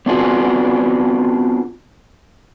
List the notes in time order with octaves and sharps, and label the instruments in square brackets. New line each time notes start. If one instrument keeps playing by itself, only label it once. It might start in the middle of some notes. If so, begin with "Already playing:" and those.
[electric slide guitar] B3 C4 D4 F4 F#4 G#4